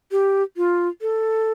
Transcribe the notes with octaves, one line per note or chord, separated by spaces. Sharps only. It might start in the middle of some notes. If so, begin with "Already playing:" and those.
G4
F4
A4